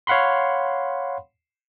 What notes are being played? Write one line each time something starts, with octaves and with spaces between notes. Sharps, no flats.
C#5 F5 F#5 B5 C6